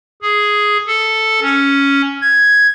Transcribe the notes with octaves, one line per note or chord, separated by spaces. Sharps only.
G#4
A4
C#4
G#6